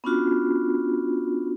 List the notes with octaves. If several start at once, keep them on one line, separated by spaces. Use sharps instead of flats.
B3 C#4 D4 F4 F#4